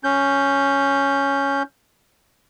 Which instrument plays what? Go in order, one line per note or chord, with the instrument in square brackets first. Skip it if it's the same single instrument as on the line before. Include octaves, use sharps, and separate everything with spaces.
[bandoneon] C#4 G6